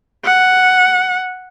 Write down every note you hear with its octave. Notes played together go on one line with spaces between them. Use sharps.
F#5